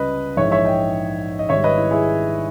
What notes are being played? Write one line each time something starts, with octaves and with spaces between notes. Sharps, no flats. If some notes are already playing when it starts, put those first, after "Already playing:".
Already playing: C#2 C#3 G3 B4 D#5
A#1 G#2 E3 G#3 C#5 E5
C#5 E5
D#5 G5
D#5
G#1 G#2 G3 C#5 E5
B4 D#5
E4
E4 G#4